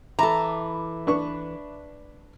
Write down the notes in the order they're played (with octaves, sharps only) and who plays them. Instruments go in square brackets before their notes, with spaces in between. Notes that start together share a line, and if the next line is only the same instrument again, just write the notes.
[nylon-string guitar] E3 A4 [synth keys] E5 B5 D6 [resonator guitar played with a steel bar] A#5
[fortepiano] D4 B4 C#6